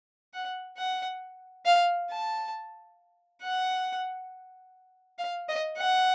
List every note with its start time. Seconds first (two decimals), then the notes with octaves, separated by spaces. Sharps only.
0.34 F#5
0.78 F#5
1.65 F5
2.10 A5
3.42 F#5
5.18 F5
5.49 D#5
5.78 F#5